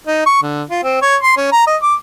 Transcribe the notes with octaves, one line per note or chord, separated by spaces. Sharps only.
D#4
C#6
D3
F4
C4
C#5
C6
C#4
A#5
D#5
D6